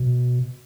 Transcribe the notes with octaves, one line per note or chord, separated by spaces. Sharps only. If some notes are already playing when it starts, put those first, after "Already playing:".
Already playing: B2